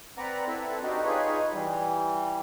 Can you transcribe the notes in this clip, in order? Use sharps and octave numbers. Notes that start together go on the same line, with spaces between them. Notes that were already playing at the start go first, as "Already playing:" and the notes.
C4 B4 D5 F#5 A#5
C4 E4 A4 B4
D4 D#4 F#4 G4
D#4 F4 G#4 B4 C#5
E3 G3